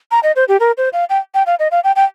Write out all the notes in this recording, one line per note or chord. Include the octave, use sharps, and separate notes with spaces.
A#5
D#5
C5
G4
A#4
C5
F5
G5
G5
F5
D#5
F5
G5
G5